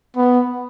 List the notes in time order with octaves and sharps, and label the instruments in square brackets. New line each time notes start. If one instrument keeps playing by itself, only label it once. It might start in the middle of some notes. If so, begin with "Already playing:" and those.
[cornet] B3